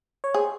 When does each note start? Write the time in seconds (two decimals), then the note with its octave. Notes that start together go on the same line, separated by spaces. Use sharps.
0.24 C#5
0.34 G#4 C5